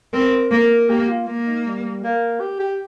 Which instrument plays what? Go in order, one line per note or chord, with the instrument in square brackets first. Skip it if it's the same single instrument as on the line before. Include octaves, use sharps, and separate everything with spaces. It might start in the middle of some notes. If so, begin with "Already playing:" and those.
[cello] C4 [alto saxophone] A#4
[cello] A#3 [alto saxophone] A#4
[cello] A#3 [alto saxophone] G4
[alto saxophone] F4
[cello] A#3
[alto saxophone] D#4
G3
A#3
G4
G4